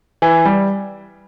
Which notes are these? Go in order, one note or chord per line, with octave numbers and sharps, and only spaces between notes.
E3
G3